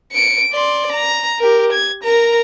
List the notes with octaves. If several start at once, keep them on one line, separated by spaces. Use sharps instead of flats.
C#7 D7
D5 C6
A#5
G4 A#4
G#6
A#4 A#5